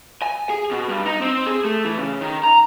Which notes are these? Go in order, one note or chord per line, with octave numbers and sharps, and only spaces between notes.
G#5
G#4
B2
G2
D#4
C4
G#4
A3
E3
C#3
D#3
A#5